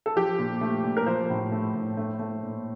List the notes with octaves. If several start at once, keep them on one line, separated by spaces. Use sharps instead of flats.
A4
F3 G4
A#2
A3
A#2
A#4
F3 C5
A2
A3
A2
A3
A3
A#2